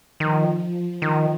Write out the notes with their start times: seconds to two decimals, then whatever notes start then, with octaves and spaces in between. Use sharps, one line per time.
0.20 D#3 F3
1.02 D#3